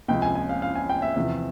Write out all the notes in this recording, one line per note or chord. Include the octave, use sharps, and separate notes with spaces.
C#2 C3 F3 G5
G#5
G#5
F5
F5
G#5
G5
E5
E2 C3 F3